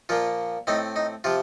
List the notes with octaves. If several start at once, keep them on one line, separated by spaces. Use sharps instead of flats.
A#2 F3 A#3 F4
A2 A3 C4 D#4
D#4
C3 F3 F4